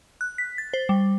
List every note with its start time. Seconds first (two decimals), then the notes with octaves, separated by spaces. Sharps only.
0.21 F#6
0.38 B6
0.58 A6
0.73 C5
0.89 G3